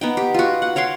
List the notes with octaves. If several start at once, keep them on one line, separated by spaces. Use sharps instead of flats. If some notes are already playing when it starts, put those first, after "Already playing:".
B3 D#4 G5
G4
F4 F#4
F#5
C#5 F5 G5 C6